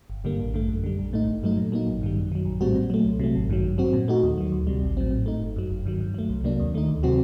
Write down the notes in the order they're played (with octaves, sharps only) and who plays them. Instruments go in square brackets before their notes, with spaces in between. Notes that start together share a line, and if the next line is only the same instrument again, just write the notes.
[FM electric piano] G1
G2 D3 G3 A#3
A1
G2 D3 A3
F#2
D3 G3
A#1
A2 A3 D#4
G1
G2 F#3 A3 D#4
A#2
F#3 A#3 D#4
A1
G2 D#3 G3
F#2
D#3 F#3
A#1
A2 G3 C4 F#4
A#2
F#3 A3
C2
C3 F#3 A3
A1
G2 D#3 F#3
G2
F#3 C4 F#4
A#2
A3 D#4 F#4
D#2
D#3 F#3
D2
C3 G3
A1
A2 F#3 C4
A2
A3 D#4
G1
F#2 F#3
G1
G2 D#3 F#3
G2
F#3 A3
C2
C3 F#3 A#3 D4
D#2
D#3 A3 D#4
D2
C3 F#3 C4 F#4